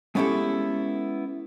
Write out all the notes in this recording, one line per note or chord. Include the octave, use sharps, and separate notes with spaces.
G#3 B3 C#4 E4 G4 A4